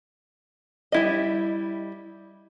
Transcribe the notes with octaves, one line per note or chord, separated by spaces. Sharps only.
G3 E4 D#5